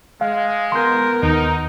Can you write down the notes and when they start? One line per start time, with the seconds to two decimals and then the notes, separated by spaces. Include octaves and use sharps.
0.21 G#3 F5
0.72 B3 A#4 C6 G6
1.23 D#2 D#4